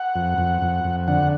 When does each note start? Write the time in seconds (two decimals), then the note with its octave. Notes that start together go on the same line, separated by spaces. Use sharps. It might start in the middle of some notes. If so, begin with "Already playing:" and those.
Already playing: F#5
0.16 F2
0.38 F2
0.62 F2
0.84 F2
1.08 D3 F#5